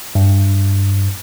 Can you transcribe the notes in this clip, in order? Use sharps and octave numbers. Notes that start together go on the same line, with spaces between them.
G2